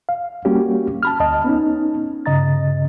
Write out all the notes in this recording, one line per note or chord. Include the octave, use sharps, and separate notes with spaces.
F5
G3 A#3 C#4 F#4 G4
A5 B5 F6
D2 D#5 A5
B3 C#4 D#4
G2 C#3 D#5 A#5 A6